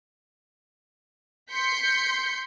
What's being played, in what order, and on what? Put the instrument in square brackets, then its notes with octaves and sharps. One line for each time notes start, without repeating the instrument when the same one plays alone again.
[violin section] C6 G6 B6 C#7